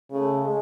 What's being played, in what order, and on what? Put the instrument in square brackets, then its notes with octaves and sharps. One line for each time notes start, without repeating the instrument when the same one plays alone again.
[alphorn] C#3 [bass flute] A3
[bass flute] G#3